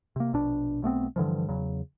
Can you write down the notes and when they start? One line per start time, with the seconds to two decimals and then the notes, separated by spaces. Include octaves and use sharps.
0.16 C3 A#3
0.33 A#1 B2 D4
0.82 B1 A3 B3 C4
1.16 G2 D3 E3 F3
1.49 E2 C#3 F#3